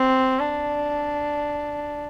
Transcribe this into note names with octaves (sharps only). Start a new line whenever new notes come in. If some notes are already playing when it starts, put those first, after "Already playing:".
Already playing: C4
D4